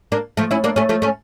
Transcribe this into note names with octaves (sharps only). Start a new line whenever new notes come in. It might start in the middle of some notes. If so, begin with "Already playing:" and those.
A#3 D4
F3 A3
C#4 E4
A#3 D4
A3 C#4
F3 A3
A3 C#4